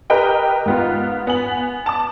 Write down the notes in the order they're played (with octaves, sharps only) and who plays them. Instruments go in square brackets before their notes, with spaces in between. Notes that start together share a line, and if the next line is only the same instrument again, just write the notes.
[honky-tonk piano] G4 A#4 B4 D#5 G5 B5
G#2 B3 F4
B3 G#5 F#7
A5 D6